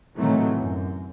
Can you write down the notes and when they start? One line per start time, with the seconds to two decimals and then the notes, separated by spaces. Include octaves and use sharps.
0.16 A2 C3 D#3 E3 F#3 A3
0.56 F#2